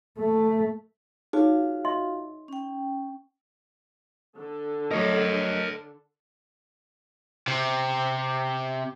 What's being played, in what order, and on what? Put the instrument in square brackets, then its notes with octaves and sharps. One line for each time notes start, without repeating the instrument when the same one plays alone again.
[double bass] A3
[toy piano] D#4 G#4 C#5 [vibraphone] F4 F#4 F5
[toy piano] D#5 E5 C6
[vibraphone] C#4 G5
[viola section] D3 A4
[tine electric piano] F#3 A3 D#5 [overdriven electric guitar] A#4 C#5
[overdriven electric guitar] C3